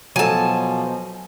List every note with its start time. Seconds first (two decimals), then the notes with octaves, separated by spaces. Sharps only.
0.16 B2 F3 F#3 A4 G#5 A5